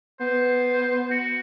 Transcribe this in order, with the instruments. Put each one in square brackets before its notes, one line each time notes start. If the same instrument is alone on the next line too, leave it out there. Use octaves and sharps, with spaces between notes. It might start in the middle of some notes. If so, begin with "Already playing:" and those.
[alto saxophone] B3 [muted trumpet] C5
[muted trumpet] F#4